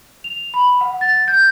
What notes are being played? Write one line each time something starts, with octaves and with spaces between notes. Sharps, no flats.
F7
B5
F#5
A6
G6